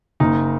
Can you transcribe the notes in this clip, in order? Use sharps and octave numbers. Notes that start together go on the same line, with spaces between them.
F#1 D#4